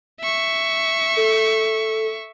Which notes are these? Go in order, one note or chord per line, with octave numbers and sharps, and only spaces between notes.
E5 C#6
A4